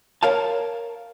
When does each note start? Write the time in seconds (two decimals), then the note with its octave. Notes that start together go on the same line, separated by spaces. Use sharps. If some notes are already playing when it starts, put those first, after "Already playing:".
0.23 A#4 C#5 F5 A5